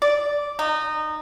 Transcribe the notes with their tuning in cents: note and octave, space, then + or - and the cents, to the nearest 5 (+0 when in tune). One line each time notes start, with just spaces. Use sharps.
D5 -5
D#4 -20